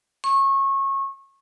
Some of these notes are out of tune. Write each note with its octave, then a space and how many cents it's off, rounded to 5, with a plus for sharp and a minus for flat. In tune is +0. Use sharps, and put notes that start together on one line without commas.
C#6 -25